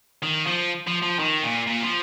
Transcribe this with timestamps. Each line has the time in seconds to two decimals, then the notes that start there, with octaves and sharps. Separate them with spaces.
0.23 D#3
0.47 F3
0.87 F3
1.02 F3
1.19 D#3
1.43 A#2
1.67 A#2
1.83 F3